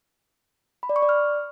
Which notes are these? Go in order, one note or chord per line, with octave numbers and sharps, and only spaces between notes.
B5
D5
C#6
D5
F6